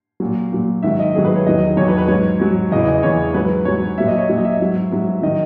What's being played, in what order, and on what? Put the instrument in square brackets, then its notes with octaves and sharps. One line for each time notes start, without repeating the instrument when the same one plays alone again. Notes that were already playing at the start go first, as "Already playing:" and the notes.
[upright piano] A#2 F#3
A#2 F#3
G#2 D#3 F#3 E5
D#5
G#2 D#3 F#3 G#4
B4
C#5
E2 D#3 F#3 D#5
E2 D#3 F#3 C#5
B4
B4
G#2 F#3 C#5
G#2 F#3
E2 C#3 E3 D#5
D#5
E2 C#3 E3 C#5
G#2 F#3 B4
G#2 F#3 C#5
A#2 F#3 E5
D#5
C#5
A#2 F#3
D#5
E5
G#2 F#3
G#2 F#3
D#3 F#3 D#5